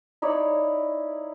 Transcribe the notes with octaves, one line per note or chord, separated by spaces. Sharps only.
D#4 E4 C#5 D5